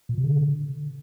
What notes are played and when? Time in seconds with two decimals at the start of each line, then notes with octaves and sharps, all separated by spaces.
0.09 A#2
0.18 C3
0.25 D3